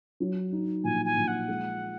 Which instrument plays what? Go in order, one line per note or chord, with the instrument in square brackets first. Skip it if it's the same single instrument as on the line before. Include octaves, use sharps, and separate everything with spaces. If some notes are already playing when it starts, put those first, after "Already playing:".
[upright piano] F#3
D#4
[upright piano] A#1 [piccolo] G#5
[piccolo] G#5
[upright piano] A#1
[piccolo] F#5
[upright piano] G#3